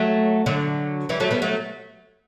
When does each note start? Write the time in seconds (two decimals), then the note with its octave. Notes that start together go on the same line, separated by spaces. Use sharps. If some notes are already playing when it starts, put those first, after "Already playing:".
Already playing: F#3 A3
0.46 D3 F#3
1.09 E3 G3
1.20 F#3 A3
1.31 G3 B3
1.42 F#3 A3